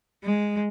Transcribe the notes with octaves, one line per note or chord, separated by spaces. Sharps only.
G#3